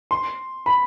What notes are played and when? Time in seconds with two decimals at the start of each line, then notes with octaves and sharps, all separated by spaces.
0.11 C6
0.66 B5